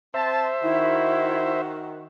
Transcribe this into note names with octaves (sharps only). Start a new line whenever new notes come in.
C4 C5 E5 A5
D#3 E4 F#4